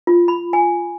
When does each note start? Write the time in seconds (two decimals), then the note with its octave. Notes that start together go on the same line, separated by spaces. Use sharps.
0.07 F4
0.28 B5
0.53 G#5